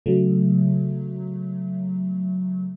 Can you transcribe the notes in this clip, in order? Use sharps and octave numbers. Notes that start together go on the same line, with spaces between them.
C#3 F#3 A3